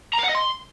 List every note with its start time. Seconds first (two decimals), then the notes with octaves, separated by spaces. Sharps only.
0.14 A#5
0.19 F5
0.24 F#5
0.29 D#5
0.35 C6